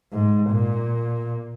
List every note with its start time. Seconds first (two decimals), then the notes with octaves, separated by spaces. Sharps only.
0.13 G#2
0.51 A#2